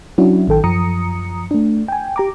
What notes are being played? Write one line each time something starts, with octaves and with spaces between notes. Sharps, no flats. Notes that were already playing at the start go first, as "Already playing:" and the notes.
F#3 C#4 D4 E4 F#4
A1 D#3 A4 G5
F#2 F3 A#5 D#6 C#7
A3 D4
G5 G#5
G4 A#5 D6